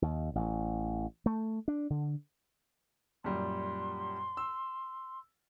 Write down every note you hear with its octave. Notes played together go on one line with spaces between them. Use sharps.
D#2
A1
A3
D4
D3
F#2 A#2 G3 C6
E6